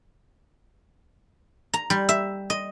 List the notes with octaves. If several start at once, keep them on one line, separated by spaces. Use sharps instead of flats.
A#5
G3
E5
D#5